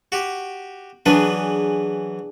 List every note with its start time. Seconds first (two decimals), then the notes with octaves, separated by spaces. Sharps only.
0.12 F#4 G4
1.06 E3 F#3 D4 G#4 B4